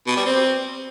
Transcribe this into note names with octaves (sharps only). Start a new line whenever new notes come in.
B2
G3
C4